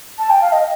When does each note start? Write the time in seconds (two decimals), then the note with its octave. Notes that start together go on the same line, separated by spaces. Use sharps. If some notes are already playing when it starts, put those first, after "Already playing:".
0.19 A5
0.30 G5
0.42 F5
0.52 D#5